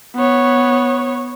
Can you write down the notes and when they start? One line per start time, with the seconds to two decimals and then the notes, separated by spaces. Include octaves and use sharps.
0.16 B3 C#5